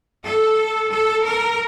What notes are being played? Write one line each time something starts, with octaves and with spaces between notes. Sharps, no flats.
A4
A4
A#4